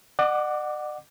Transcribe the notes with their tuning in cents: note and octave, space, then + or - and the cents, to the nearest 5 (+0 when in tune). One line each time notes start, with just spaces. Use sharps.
D5 +45 F#5 +0 D6 +0